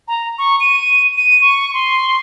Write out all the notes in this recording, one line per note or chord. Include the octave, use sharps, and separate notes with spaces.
A#5
C#6
D#7
D#7
C#6
C6